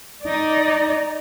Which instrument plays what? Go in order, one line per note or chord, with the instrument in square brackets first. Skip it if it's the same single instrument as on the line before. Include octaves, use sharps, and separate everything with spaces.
[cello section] D#4 D5